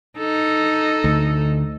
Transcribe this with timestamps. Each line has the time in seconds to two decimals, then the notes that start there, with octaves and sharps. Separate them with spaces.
0.18 D#4 A4
1.04 D2